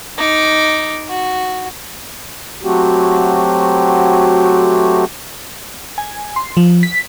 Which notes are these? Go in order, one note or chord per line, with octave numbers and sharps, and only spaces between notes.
D#4 D6
F#4
F#3 A3 C4 F#4 G4
G#5
C6
F3
B6